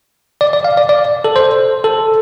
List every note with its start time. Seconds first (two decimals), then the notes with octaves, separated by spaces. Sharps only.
0.41 D5
0.53 D5
0.64 F5
0.77 D5
0.89 D5
1.24 A4
1.36 C5
1.84 A4